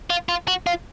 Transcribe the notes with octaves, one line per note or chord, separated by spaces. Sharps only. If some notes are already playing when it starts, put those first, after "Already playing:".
F4
F4
F#4
F4